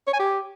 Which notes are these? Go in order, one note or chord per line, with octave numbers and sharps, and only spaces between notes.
C#5
G#5
G4